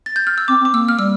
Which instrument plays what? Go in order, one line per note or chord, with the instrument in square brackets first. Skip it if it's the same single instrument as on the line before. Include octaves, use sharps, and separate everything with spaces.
[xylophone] A6
G6
F6
E6
[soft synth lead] C4 [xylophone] D6
[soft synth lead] C4
[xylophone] D6
[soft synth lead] A#3 [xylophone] E6
[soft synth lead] A#3 [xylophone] F6
[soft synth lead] G3 [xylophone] E6